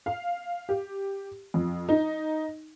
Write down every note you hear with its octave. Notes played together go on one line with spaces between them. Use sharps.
F5
G4
F2
D#4